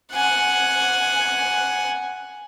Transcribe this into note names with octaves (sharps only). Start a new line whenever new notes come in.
F#5 G#5